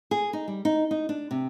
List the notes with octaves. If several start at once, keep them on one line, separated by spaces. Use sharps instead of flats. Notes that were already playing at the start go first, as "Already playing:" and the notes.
G#4
D#4
G3
D#4
D#4
D4
C3